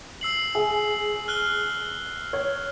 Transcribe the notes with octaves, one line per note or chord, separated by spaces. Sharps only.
E6 C7 F#7
G#4
F6 F#6 G7
C#5